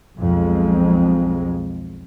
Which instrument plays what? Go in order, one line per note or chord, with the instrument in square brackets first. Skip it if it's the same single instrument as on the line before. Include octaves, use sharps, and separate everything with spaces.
[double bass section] B1 F2 G#3